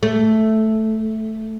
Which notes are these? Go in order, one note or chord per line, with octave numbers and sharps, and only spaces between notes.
A3